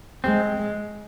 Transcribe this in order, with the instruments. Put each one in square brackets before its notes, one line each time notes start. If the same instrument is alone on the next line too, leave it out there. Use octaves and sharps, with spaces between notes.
[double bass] G#3 [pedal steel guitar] C4